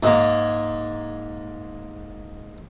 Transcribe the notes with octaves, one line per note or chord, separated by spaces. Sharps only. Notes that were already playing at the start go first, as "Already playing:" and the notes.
G#2 G#3 A#3